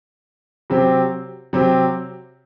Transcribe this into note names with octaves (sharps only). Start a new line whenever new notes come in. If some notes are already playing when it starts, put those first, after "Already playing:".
C3 F#3 C4 G4
C3 F#3 C4 G4